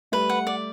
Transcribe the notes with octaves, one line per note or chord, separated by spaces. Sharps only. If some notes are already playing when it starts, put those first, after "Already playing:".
G3 A3 B4
F#5
D5